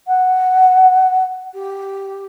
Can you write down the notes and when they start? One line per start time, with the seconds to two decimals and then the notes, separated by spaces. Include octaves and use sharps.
0.07 F#5
1.54 G4